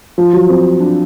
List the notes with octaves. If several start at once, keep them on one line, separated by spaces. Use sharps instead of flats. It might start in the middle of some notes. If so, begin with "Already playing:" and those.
F3
F#3
C4
D4